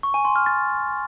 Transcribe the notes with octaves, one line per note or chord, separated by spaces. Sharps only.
C#6
G#5
C6
F6
A6